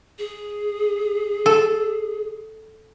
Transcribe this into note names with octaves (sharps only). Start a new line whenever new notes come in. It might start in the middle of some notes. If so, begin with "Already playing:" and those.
G#4
A4